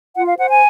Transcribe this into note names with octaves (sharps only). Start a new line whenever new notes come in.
F4 F#5
F5
C5 F#5
G#5